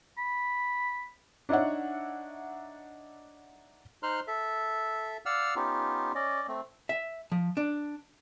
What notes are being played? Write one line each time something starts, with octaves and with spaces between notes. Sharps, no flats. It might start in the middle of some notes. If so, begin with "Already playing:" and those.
B5
D4 D#4 C#5 E5 F#5
D#4 C5 C6 F6 F#6
A4 E5
D5 F5 F#5 E6 F6
B3 C#4 D#4 F4 G4
C#4 D5 D#5
A3 C4
E5
F3
D4